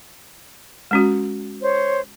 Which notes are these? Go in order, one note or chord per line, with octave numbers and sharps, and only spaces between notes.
G#3 C#4 F#4
C5 C#5